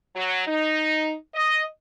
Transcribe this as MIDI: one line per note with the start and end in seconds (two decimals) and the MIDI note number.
0.16 0.45 54
0.47 1.14 63
1.35 1.63 75